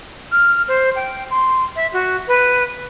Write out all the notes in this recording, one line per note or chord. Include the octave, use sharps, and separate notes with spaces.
F6
C5
G5
C6
E5
F#4
B4